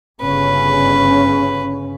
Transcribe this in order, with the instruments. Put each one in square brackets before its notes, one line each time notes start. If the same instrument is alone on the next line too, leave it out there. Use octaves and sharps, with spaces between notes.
[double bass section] G1 C#3 C#4 [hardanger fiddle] B4